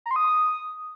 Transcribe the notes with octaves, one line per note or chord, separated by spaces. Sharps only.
A#5
C6
D#6